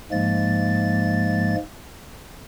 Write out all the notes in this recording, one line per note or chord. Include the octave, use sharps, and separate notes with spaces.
G#2 F3 G#3 A#3 A6